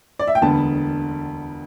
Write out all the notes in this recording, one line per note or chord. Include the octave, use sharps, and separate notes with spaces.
D5
E5
G5
E1 D2 D3 B3 A5